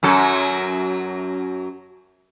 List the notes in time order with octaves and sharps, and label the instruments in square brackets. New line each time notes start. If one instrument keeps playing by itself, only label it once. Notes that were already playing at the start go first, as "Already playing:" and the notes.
[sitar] F#2 F#3 A4